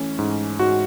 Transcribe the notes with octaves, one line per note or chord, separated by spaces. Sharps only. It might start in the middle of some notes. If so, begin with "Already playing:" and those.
Already playing: E3 A3 C#4
G#2
G#2 F#4